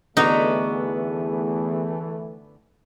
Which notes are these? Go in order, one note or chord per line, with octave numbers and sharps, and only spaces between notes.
E2 D3 E3 A3 B3 D#4 F#4